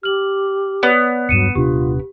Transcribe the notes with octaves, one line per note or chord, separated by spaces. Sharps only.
G4 F6 F#7
B3 B4 C#5 D5
D#1 G2 F#3 C#7 D#7 E7
D#1 C3 D4 F4 G4